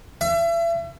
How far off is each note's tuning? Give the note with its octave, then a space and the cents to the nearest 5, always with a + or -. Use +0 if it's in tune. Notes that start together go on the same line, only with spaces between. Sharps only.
E5 +35